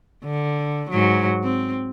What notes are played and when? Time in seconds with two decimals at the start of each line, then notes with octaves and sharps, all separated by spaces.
0.24 D3
0.90 G#2 F#3
1.44 C4